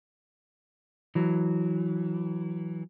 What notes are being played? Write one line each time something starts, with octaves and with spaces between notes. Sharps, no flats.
E3 F#3